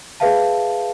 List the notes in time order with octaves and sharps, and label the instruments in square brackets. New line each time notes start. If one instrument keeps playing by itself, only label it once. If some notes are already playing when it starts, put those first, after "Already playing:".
[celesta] G#4 B4 E5 F5 A5